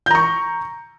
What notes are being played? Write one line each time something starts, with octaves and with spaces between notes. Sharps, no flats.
A#5 C#6 G6